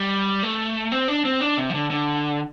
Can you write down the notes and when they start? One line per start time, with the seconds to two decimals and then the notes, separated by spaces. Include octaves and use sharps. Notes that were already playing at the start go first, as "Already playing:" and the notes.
Already playing: G3
0.43 A3
0.92 C4
1.08 D4
1.25 C4
1.41 D4
1.58 C3
1.70 F3
1.74 D3
1.90 D3